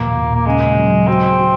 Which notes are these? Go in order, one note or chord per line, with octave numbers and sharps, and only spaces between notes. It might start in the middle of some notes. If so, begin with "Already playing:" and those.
Already playing: D#2 A#2 F3 A#3
A#2
A#3
C#3 G#3
F#3
C4 F#4
F#4